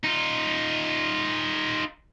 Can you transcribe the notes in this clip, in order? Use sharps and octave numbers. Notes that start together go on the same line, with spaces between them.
D#4 F4